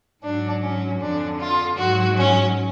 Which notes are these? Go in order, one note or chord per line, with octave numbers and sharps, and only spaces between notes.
G#2 F#3 D4
C#4
F2 D3 F3 D4
F4
G#2 F#3 F#4
C#4